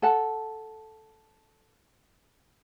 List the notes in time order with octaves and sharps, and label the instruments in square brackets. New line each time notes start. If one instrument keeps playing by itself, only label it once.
[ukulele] A4 F#5 A5